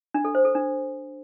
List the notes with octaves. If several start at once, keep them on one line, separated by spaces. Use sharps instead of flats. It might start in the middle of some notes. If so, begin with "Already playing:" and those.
D4
A4
C5
A4
D4